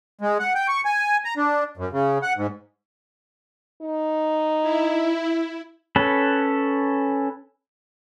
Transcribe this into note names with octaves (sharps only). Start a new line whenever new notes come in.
G#3
F#5
G5
C#6
G#5
A#5
D4
F#2
C#3
F#5
G#2
D#4
E4
C#4 A4 B4